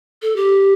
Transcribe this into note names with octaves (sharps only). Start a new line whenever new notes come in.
A4
G4